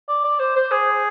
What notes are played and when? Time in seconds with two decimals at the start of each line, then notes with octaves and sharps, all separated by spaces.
0.08 D5
0.24 D5
0.39 C5
0.56 C5
0.71 G#4